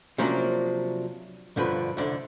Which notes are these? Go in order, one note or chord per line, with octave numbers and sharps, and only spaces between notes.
C3 F3 F#3 A#3 C#4 D4
B1 G2 D3 F3 B4
C2 F2 D3 D5